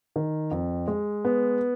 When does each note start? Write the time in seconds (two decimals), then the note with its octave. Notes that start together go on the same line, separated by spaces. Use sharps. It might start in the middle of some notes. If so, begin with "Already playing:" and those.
0.16 D#3
0.51 F2
0.88 G#3
1.25 B3